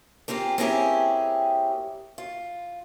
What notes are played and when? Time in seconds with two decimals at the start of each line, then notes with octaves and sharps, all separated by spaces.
0.28 A#3 C4 F4 G4 G#4
0.58 A#3 C4 C#4 E4 G4 G#4
2.18 F4